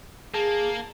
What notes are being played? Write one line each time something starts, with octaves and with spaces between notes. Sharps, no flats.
A#3 G#4 A5